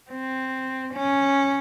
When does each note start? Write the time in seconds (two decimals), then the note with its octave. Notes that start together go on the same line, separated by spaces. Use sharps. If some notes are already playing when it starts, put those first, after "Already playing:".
0.11 C4
0.94 C#4